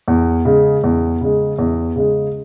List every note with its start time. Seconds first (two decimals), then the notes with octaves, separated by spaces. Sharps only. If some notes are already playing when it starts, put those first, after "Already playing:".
0.08 E2
0.45 C#3 G#3
0.84 E2
1.21 C#3 G#3
1.58 E2
1.96 C#3 G#3